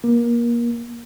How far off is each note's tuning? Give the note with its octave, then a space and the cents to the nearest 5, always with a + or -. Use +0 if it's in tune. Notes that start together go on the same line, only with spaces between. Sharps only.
A#3 +25